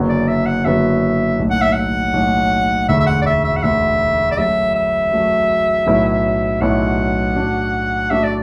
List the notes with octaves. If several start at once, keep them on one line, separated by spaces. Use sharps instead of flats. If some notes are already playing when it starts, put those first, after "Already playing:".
Already playing: F#1 F#2 D3 B3 F#4
D5
E5
F#5
F#1 F#2 D3 B3 F#4 E5
B1 A2 A3
F#5
E5
F#5
B1 A2 A3
E1 D2 D3 E5
E5
F#5
D5
E5
E5
F#5
E1 D2 D3 E5
D5
F#2 F#3 A3 F#4 E5
E5
F#2 F#3 A3 F#4
B1 A2 F#3 B3 E4
B1 A2 F#3 B3 E4 F#5
A2 A3 D4 F#4
A2 A3 D4 F#4 E5
D5